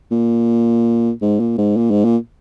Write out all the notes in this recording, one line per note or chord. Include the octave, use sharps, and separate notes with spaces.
A#2
G#2
A#2
G#2
A#2
G#2
A#2